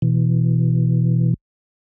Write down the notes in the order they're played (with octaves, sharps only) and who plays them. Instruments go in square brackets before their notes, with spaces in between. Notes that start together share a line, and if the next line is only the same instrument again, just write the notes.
[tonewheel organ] B2 E3